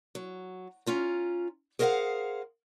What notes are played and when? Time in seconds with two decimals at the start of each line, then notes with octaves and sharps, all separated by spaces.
0.15 F#3
0.86 C#4 F4 A#5
1.79 G#4 A#4 C5 D#5 F5 F#5